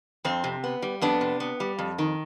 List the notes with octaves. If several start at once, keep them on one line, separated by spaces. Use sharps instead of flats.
F2 C4
C3
B3
G3
F2 B3 D4
C3
B3
G3
F2
D#3